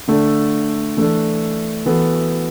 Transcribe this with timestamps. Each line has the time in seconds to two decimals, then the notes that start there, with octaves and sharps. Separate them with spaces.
0.08 D3 A3 D4 A4
0.97 E3 A3 D4 A4
1.86 E3 B3 F#4 A4